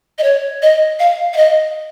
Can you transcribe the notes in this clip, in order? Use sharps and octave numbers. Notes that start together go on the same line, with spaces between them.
D#5
C#5
D#5
F5
F5
D#5